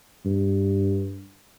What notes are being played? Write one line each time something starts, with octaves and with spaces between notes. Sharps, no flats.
G2